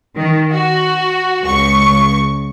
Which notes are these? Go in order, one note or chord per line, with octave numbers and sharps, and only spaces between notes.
D#3
F#4
C#2 C#6